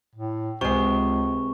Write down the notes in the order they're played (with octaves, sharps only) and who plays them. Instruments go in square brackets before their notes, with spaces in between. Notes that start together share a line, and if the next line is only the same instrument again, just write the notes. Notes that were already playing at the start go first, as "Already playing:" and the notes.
[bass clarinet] A2
[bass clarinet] C#2 [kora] C3 G#3 [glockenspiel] C#6